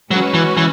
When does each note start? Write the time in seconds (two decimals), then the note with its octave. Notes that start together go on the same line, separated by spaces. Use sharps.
0.10 F#3 G#3 C#4 F#4 B4
0.34 E3
0.57 E3